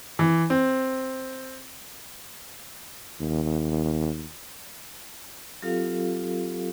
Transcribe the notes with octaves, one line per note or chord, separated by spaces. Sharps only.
E3
C4
D#2
F#3 C4 F4 G4 A4 F5